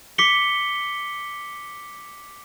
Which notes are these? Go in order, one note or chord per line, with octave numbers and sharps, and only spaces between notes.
D6 B6 C#7 G7